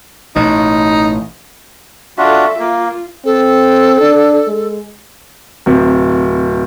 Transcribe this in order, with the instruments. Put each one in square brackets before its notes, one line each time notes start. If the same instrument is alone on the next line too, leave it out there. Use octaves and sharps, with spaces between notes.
[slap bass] A1 B2 [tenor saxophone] D#4
[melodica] D4 F4 F#4 [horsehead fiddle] A4 E5
[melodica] A#3 [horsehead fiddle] F4
[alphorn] C4 [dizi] A4
[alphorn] D4
G#3
[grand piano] D1 C3